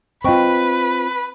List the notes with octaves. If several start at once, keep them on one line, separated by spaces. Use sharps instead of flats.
C4 F4 B4 D#5 G5 C#6